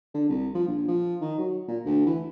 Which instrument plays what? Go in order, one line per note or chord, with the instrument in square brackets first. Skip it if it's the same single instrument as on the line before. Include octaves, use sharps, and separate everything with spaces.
[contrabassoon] D3
C2
F3
A#1
F3
D#3
F#3
A#2
D2
E3